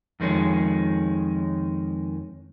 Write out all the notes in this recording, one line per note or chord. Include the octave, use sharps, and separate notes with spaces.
F2 D#3 G#3 C#4